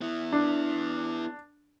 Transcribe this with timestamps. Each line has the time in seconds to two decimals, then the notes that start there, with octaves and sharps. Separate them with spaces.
0.01 B3 E4
0.33 D4